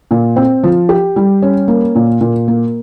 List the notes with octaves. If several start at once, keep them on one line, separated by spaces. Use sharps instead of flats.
A#2
C4
F3
G4
G3
C#4
A#3
A#2
A#2
A#3